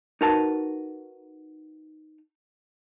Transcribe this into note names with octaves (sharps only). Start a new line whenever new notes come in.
D#4 F#4 A#4 B4 A5